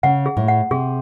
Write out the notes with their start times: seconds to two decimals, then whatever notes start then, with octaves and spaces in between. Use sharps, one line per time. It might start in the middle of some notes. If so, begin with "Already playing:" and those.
0.03 C#3 F#5
0.26 G#4
0.37 A2
0.48 F#5
0.71 C3 G#4